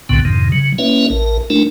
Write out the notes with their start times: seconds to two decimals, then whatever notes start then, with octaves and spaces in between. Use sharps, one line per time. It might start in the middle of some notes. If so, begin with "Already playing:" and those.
0.09 C2 F#2 A2 D3 B3
0.25 F2 G#2 C3 D#3
0.52 C#3 F#3
0.78 A#3 C#4 E4 B4 C#5 E5
1.10 A1 A#4
1.50 A3 D4 E4 A#4